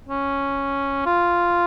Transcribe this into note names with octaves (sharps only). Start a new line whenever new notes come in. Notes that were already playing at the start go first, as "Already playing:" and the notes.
C#4
F4